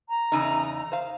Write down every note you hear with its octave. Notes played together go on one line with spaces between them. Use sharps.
A#5
E2 C#3 D#4
C5 F5